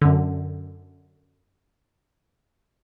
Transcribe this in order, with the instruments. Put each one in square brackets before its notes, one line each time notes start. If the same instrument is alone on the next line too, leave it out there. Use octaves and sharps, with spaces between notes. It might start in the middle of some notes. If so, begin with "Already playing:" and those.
[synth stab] F#2 D3